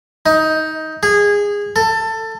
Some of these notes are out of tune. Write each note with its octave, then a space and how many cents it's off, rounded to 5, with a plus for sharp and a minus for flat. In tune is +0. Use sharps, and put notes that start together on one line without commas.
D#4 +15
G#4 -20
A4 +20